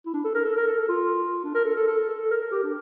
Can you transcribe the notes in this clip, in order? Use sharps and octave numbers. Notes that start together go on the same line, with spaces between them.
E4
D4
A4
A#4
A4
A#4
A4
A4
F4
D4
A#4
A4
A4
A4
A4
A#4
A#4
G4
D4